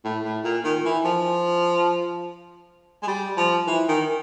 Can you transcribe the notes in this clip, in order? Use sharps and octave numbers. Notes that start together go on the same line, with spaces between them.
A2
A2
A#2
D#3
E3
F3
G#3
G3
F3
E3
D#3